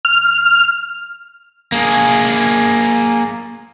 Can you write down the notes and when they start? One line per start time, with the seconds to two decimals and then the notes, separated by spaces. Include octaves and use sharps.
0.05 F6
1.72 A#3 G#4